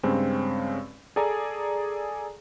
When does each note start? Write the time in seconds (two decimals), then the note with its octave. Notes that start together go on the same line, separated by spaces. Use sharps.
0.03 G2 C#3 G#3 C4 C#4
1.16 G#4 A4 D5 G#5 A#5